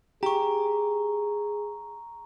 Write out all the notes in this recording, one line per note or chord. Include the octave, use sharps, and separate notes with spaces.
G4 G#4 A#5 C#6